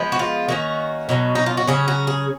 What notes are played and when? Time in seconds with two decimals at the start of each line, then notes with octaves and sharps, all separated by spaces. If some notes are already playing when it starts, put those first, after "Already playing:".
Already playing: F3 G#3 B3
0.12 F#4
0.19 F4
0.48 D#3 A#3 C#4 F#4
1.09 B2 F#3 A#3 C#4
1.35 D#4
1.46 F4
1.57 F#4
1.67 C#3 F#3 C#4 G#4
1.88 F#4
2.07 G#4